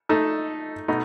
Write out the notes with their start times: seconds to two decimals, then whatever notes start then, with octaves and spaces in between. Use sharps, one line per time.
0.09 A3 D#4 A4
0.88 B2 A3 D#4